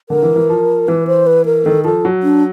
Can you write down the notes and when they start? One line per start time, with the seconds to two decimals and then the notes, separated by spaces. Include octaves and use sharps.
0.09 D3 A#4
0.23 E3
0.36 E3
0.49 F3
0.88 E3 B4
1.07 C5
1.27 B4
1.46 A#4
1.65 D#3 A4
1.84 F3 A4
2.05 F#3
2.23 D4